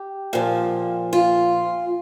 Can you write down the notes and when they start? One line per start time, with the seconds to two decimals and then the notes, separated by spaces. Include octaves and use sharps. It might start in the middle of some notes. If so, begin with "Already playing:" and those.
Already playing: G4
0.33 A#2 F3
1.13 F4